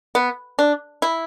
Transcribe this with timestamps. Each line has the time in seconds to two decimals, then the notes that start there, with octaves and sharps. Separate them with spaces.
0.15 B3
0.59 D4
1.02 E4